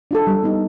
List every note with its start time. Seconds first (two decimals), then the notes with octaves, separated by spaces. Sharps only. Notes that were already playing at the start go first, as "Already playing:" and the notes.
0.11 D4 F4 A4
0.27 G3
0.43 B3 D#4